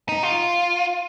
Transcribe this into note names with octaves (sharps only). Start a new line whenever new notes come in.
D#4
F4